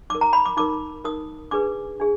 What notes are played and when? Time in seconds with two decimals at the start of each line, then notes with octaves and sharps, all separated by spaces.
0.10 D#4 A#4 D6
0.21 A#5
0.33 B5
0.45 D6
0.57 D#4 A#4 D6
1.04 D#4 A#4 D#6
1.51 D4 G#4 B4 D6
2.00 D4 G#4